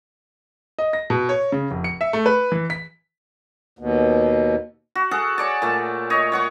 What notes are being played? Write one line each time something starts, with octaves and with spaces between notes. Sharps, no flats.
D#5
A#6
B2
C#5
C#3
F1
C#7
E5
A3
B4
E3
B6
D#2 B2
F#4
G#4 A4 F#5
C#5 D5 A5
A#2 A3
C#5 D#5
C#5 F#5 C#6